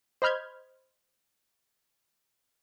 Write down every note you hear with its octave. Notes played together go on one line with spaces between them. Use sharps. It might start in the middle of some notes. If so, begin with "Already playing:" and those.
C5 D#5 B5 F6 G6 G#6